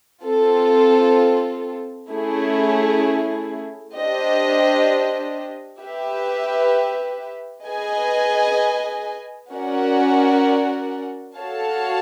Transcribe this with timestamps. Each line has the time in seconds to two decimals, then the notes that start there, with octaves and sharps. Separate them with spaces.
0.24 C4 F4 A4
2.11 A3 C#4 E4 G#4
3.95 D4 G4 C5 D#5
5.81 G4 B4 E5
7.67 G#4 B4 D#5 G#5
9.51 C#4 F#4 A#4 D5 F#5
11.38 F#4 A4 C#5 F5 A5